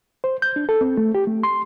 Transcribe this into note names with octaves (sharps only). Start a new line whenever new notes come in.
C5
G6
D4
A4
C4
A3
G4
A3
C6